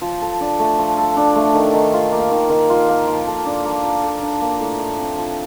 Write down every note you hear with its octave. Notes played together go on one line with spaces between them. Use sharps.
F3
A4
D4
A3
F3
A4
D4
A3
D#3
D#3
F4
A#3
D#3
D#3
F4
A#3
F3
A4
D4
A#3
F3
A4
D4
A#3
A2
A2
C4
F3